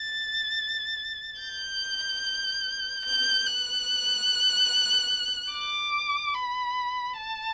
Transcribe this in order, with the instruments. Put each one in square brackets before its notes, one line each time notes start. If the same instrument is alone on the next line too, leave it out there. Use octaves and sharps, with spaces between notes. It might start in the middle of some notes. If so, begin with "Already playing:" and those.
Already playing: [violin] A6
G6
G6
F#6
D6
B5
A5